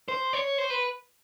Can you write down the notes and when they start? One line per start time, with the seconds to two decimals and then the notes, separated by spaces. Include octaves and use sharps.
0.08 C5
0.33 C#5
0.58 C5
0.70 B4